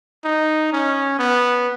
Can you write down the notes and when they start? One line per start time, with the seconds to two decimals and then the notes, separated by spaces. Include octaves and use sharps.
0.25 D#4
0.73 C#4
1.19 B3